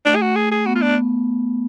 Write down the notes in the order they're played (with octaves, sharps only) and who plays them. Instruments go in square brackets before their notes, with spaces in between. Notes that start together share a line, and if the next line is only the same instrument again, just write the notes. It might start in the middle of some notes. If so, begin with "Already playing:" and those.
[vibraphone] A3 [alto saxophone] D4
[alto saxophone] G#4
F#4
G#4
G#4
[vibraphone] B3 [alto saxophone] F#4
[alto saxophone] F4
D4